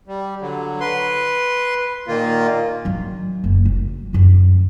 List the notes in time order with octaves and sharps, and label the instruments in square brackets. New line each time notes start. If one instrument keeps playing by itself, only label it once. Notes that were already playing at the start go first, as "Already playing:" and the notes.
[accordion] G3
D3 F#3
B4 C6
A#2 D#3 A#3 F4
[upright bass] D#3 F#3
F#1
F#3
F#2 D3